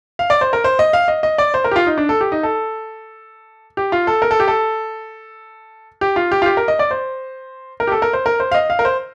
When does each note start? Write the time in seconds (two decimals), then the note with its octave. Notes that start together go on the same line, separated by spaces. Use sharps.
0.19 F5
0.30 D5
0.41 C5
0.53 A#4
0.64 C5
0.79 D#5
0.93 F5
1.08 D#5
1.23 D#5
1.38 D5
1.54 C5
1.64 A#4
1.71 G4
1.76 F4
1.87 D#4
1.98 D4
2.09 A4
2.21 G4
2.32 D#4
2.43 A4
3.77 G4
3.92 F4
4.07 A4
4.22 A#4
4.31 A4
4.40 G4
4.48 A4
6.01 G4
6.16 F4
6.32 G4
6.42 F4
6.46 G4
6.57 A#4
6.68 D#5
6.79 D5
6.91 C5
7.80 A#4
7.87 G4
7.92 A4
8.02 A#4
8.13 C5
8.26 A#4
8.40 C5
8.52 F5
8.54 D#5
8.70 F5
8.79 A#4
8.85 C5